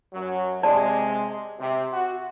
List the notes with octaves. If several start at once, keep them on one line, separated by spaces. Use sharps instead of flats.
F#2 F#3
C3 G#3 D5 A5
C3
F#4